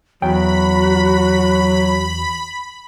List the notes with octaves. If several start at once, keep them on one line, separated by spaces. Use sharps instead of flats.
E2 F#3 F#4 G5 B5